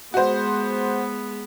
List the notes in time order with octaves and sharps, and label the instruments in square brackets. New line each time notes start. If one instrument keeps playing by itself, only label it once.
[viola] G#3 B3 [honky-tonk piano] F#4 C5